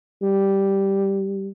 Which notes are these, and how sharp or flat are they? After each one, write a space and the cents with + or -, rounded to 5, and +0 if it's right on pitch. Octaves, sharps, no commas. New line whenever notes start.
G3 -5